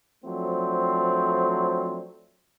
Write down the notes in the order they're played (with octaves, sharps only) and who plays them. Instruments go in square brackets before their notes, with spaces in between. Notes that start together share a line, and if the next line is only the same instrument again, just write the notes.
[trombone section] F3 F#3 A3 C4 D4